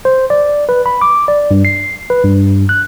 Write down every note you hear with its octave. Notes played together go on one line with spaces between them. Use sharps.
C5
D5
B4
B5
D6
D5
G2
C7
B4
G2
F#6